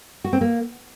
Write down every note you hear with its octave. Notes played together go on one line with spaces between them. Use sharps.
F#4
C4
A#3